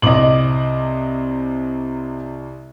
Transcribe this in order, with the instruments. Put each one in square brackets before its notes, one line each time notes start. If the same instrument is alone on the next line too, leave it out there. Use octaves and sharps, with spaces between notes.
[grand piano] C2 C3 D6 [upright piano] D#5 F#7